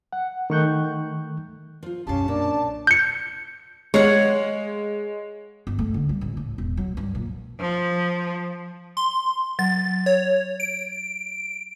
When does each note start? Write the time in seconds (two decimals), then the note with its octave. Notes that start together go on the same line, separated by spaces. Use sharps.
0.13 F#5
0.50 D#3 A3 C#6 F#6 G6
1.83 F3 F4
2.07 B1 F#2 C#4 G4 F5 A5
2.28 A#2 C#4 D4
2.87 G6 C#7
3.94 G#3 C#5 F5 F#5
5.67 G1
5.79 A3
5.94 D3
6.09 G3
6.21 A1
6.37 A2
6.58 E1
6.77 F#3
6.97 G2
7.15 A#2
7.60 F3
8.97 C6
9.59 F#3 A6
10.06 C#5
10.60 D7